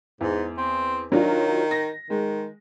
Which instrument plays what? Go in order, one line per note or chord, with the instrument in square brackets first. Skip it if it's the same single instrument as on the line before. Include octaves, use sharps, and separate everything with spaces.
[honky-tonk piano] E2 [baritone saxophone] G#2
[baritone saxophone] C4
[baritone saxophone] D#3 [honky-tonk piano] F#3 D4 F4
[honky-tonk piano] A#6
[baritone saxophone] D#3 [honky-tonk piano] G#3